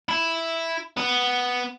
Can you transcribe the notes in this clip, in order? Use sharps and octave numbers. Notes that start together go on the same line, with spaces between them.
E4
B3